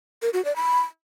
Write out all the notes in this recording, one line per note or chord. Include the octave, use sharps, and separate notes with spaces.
A#4
F#4
D5
B5